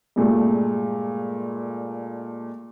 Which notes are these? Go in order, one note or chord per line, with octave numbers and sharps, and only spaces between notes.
G2 A#2 G#3 A3